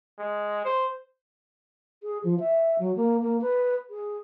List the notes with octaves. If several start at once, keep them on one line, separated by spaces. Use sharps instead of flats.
G#3
C5
G#4
F3
E5
F#3
A#3
A#3
B4
G#4